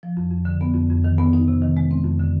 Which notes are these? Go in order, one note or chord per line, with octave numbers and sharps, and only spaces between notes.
F3
F2
F2
D3
B3
F2
F2
D#3
B3
D#4
C3
D#3
G#3
C4
F2
D3